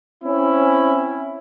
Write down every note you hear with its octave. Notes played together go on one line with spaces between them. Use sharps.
C4 C#4 E4